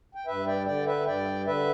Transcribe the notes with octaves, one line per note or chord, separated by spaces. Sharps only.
G5
G2 B4 E5
D5 G5
D3 D5 G5
B4 E5
G2 D5 G5
D3 B4 E5